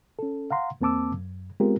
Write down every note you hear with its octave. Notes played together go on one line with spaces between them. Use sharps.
C#4 A4
F5 F#5 A#5 C6
E2 A#3 C4 A5 D6 E6
F#2
G#3 B3 C4 F4 G4 A#4